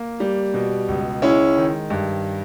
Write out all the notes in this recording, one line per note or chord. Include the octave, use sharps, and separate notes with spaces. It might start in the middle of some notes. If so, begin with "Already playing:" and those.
Already playing: A#3
G3
B2
C#2
G#3 C#4 E4
D#3
G2